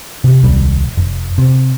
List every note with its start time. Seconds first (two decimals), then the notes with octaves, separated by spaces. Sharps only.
0.24 C3
0.43 D#1 C2 G3
0.97 F1
1.38 C3